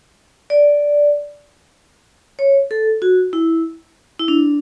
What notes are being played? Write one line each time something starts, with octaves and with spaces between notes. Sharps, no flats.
D5
C#5
A4
F#4
E4
E4
D4